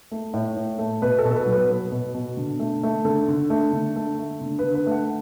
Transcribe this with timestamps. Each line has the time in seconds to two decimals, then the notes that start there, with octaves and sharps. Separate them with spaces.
0.11 A3
0.34 A2
0.56 A2
0.78 A3
1.02 B2 B4
1.19 A4
1.25 B2
1.31 A4
1.35 B4
1.46 F#3
1.52 B4
1.70 B3
1.92 B2
2.14 B2
2.37 D3
2.60 A3
2.83 A3
3.05 D3 A4
3.28 D3
3.50 A3
3.73 D3
3.96 A3
4.19 A3
4.41 D3
4.59 D3 B4
4.75 B4
4.87 A3
4.92 F#5